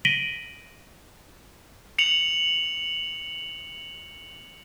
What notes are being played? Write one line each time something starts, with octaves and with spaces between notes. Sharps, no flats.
A#6 B6 D7 D#7 F#7 G7
C#7 F7 F#7